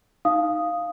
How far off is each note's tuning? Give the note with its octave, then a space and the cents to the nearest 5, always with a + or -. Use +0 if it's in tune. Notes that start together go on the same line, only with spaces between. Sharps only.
D#4 +0 F5 +0 D#6 +0